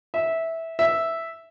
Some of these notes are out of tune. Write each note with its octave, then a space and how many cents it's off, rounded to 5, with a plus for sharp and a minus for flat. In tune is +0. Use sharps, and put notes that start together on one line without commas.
E5 -10
E5 +0